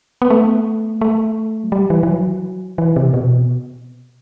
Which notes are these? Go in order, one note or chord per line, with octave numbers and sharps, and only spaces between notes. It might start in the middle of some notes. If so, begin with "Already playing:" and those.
B3
A3
A3
F#3
G3
E3
E3
F#3
E3
C3
B2